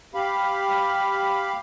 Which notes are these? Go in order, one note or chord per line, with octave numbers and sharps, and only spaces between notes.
G4 F5 B5